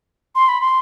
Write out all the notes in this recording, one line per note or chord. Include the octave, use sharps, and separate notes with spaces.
C6
B5
C6